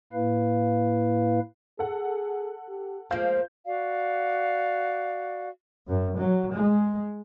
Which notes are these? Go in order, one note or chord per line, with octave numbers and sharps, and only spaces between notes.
A2 A#3 E4 B4 F5
G#4 A4 F#5
G4
F3 G#3 A#3 F4 F5 G6
F#4 D5 F5
F#2
F#3
G#3